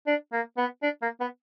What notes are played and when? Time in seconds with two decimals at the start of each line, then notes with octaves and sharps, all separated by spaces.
0.07 D4
0.33 A#3
0.58 B3
0.83 D4
1.02 A#3
1.20 B3